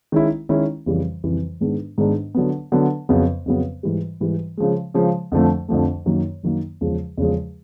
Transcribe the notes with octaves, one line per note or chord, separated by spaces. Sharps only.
D#3 G#3 C#4 E4
D#3 G#3 C#4 E4
F2 C#3 E3 G3
F2 C#3 E3 G3
G#2 D#3 G#3 B3 D4
G#2 D#3 G#3 B3 D4
D3 F#3 B3
D3 F#3 B3
F2 C#3 F#3 B3
F2 C#3 F#3 B3
G#2 E3 G3
G#2 E3 G3
C#3 F3 G#3
C#3 F3 G#3
F2 D3 F3 A3
F2 D3 F3 A3
F#2 D#3 F#3 A#3
F#2 D#3 F#3 A#3
E2 C#3 F3 G#3
E2 C#3 F3 G#3